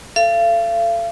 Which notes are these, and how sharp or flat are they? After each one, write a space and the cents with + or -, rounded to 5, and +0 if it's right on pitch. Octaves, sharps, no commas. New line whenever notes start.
A4 +0 F5 -40